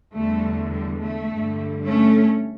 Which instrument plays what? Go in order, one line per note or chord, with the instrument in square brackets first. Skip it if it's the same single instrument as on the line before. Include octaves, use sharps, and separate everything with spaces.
[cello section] E2 D3 G3 A3
G3
A3
G2 D3 G3
A3 C#4